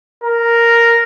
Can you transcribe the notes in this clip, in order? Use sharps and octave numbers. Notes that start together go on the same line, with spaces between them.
A#4